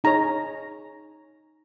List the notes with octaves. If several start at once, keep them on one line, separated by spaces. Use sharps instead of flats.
D#4 G#4 C#5 A#5